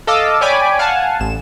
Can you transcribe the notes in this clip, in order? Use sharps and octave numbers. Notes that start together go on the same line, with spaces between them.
A4 D#5 F5 D6 E6
C#5 D5 G5 G#5 B5 D6
F5 F#5 G#5 A5
A1 E7